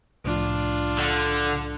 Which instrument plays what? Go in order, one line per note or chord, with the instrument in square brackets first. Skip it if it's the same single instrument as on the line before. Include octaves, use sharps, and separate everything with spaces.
[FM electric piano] C2 A2 F3 [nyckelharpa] D4 F4
[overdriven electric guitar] D3